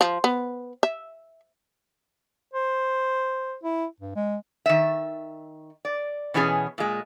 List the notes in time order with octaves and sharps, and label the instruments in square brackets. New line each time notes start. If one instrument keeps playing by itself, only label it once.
[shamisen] F3
B3
E5
[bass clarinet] C5
E4
G2
G#3
[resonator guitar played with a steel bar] D#3 E5
D5
B2 E3 B3 C#4 G#4
A#2 G#3